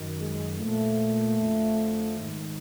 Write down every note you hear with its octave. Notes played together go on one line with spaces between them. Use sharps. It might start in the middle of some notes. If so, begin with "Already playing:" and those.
Already playing: F#2 D#3
G#3
A#2 F3 A3
F2 D3 F3
G#2 D#3